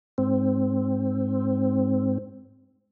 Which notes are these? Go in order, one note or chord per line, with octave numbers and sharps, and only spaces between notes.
G#2 C4